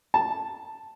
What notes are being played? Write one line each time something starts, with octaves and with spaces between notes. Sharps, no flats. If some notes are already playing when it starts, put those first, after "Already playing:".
A5